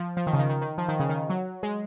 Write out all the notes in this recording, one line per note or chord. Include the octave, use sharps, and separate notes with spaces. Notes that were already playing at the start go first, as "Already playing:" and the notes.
Already playing: F3
F3
D#3
C#3
D#3
D#3
D#3
F3
D#3
C#3
D#3
F#3
G#3